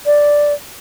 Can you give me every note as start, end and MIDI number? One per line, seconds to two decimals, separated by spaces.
0.06 0.53 74